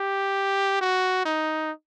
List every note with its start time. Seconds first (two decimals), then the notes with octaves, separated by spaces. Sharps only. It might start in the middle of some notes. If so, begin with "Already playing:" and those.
Already playing: G4
0.81 F#4
1.25 D#4